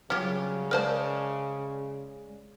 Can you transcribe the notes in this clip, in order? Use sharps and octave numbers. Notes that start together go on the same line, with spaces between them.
C#3 F#3 G3 C#4 F4 G4
G#3 A#4 C5 D5 A5